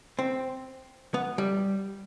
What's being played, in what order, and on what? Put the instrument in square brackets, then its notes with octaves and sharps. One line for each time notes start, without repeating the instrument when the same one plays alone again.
[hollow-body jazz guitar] C4
B3
G3